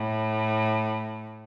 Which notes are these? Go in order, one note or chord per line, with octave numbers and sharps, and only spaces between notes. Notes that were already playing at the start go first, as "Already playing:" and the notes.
Already playing: A2